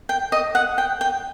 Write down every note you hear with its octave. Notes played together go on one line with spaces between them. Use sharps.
G5
D#5
F#5
G5
G5